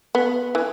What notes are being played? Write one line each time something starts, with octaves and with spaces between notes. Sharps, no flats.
B3
E3